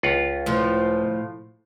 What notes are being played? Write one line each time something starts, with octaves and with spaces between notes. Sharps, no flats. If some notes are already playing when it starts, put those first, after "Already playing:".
C#2 F4 F#5
A2 F3